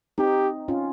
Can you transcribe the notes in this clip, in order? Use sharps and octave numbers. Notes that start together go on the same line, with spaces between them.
C4 D#4 G4
C#4 F4